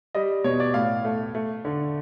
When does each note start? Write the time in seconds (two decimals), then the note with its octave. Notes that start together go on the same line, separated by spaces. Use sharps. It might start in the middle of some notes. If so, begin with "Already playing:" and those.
0.15 G3 D#5
0.44 B2 C#5
0.60 D5
0.74 A2 F5
1.05 A3
1.35 A3
1.65 D3